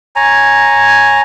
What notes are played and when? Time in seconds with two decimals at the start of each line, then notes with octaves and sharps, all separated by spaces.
0.16 C#5 G#5 A#5